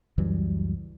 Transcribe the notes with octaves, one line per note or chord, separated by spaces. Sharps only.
C#2 F#2 E3 G3